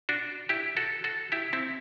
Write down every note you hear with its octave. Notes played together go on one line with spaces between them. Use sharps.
D4 F#4
E4 G4
F#4 A4
F#4 A4
E4 G4
C4 E4